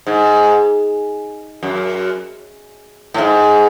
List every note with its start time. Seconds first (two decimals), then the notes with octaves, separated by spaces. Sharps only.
0.07 G#2
1.63 F#2
3.14 A2
3.18 G#2